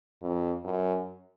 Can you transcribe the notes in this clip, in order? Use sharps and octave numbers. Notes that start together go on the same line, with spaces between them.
F2
F#2